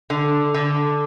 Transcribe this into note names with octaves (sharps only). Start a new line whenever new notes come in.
D3
D3